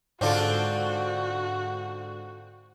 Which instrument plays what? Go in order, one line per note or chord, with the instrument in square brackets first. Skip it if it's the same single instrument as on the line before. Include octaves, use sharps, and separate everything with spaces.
[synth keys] G#2 D3 A4 [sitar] C4 D4 F4 [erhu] F#4